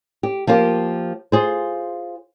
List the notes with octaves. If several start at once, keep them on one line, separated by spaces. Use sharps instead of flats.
G4
F3 A#3 F4 G4
F4 G#4 C5